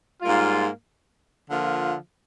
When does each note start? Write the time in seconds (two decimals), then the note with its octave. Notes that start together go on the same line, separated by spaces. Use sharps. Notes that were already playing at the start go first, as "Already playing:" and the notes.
0.22 G#2 G3 A#3 F4
1.49 D3 F3 A#3 F4